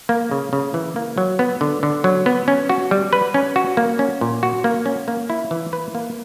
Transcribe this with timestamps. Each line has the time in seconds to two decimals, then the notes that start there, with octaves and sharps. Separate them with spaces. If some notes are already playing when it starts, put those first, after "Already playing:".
0.09 A#3
0.31 C#3
0.53 C#3
0.74 E3
0.96 A#3
1.18 F#3
1.39 B3
1.61 D3
1.83 D3
2.04 F#3
2.26 B3
2.48 C#4
2.69 F#4
2.91 G3
3.13 B4
3.34 C#4
3.56 F#4
3.77 A#3
3.99 C#4
4.21 A#2
4.43 F#4
4.64 A#3
4.86 C#4
5.08 A#3
5.30 E4
5.51 E3
5.73 B4
5.95 A#3